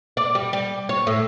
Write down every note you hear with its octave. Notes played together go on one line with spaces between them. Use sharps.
D5
G3
G3
C#5
A2